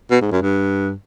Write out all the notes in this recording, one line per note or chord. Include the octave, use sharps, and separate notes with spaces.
B2
G#2
F#2
G2